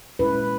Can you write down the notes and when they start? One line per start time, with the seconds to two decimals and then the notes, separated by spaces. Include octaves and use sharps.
0.19 A#2 G#3 C#4 E4 B4